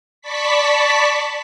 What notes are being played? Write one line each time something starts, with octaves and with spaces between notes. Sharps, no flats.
D5 A5 B5 C#6 B6